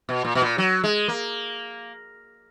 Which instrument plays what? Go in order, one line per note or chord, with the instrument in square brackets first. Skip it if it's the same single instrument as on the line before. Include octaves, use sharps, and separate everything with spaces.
[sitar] B2
A#2
B2
A#2
F#3
G#3
A#3